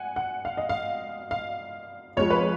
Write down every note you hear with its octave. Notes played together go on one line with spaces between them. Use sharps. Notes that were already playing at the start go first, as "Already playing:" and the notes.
Already playing: F#5 G#5
F#5
F5
D#5
F5
F5
F2 F3 G#3 C#5
B4